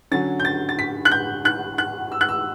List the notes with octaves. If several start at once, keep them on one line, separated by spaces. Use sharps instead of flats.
D3 F#3 C#4 A6
G6
A6
A6
B6
F#6
G6
F#6
F#6
E6
F#6
E6